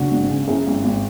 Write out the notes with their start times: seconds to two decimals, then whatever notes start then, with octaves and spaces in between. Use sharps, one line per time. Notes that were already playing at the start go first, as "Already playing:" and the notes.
Already playing: F#1 D4 F#4
0.11 G#1
0.29 C#3
0.47 F#2 E4 G#4
0.67 G#1
0.84 G#1